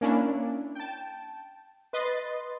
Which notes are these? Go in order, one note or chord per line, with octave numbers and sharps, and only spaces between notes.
A#3 C#4 D4 E4
G5 A5
B4 D#5 C6 A6